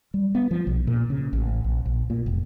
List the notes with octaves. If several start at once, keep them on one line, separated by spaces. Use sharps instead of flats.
G3
B3
F3
B1
A#2
C#3
A1
A#1
A#1
A#2
F1